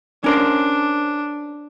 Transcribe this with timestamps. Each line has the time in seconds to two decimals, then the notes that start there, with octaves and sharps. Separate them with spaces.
0.24 C#4 D4 A#4 C5